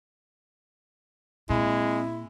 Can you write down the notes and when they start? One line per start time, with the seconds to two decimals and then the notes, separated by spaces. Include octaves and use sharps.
1.50 A#2 G#3 C4 E4